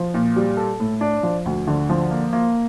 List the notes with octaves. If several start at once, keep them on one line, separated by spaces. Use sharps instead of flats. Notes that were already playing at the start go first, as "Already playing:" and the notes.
Already playing: F3
A#2
G3
A4
A2
D4
F3
D2
D3
F3
A#3
A#3